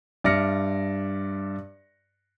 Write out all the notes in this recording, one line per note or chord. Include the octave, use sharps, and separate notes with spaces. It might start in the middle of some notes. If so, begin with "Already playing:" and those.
G2 D5 E5 F6 A#6 C#7